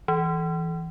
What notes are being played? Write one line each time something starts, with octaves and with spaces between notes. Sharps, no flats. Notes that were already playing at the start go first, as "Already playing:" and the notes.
E3